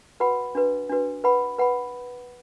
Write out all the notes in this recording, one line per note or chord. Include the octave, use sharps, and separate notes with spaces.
F#4 B4 F#5 B5
D4 F#4 B4
D4 F#4 B4
B4 F#5 B5
B4 F#5 B5